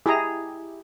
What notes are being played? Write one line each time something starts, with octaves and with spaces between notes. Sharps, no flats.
E4 G4 G#4 A#5